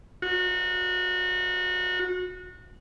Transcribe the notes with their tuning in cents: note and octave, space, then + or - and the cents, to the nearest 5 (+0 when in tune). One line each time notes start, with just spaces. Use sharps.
F#4 -25